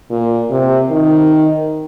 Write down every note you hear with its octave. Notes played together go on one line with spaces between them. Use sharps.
A#2
C3
D#3